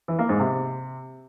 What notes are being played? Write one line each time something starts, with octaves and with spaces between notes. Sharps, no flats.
E3
A#3
G#2
C3